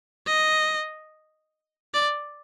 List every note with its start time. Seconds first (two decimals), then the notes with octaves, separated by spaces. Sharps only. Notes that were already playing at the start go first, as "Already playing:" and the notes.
0.27 D#5
1.94 D5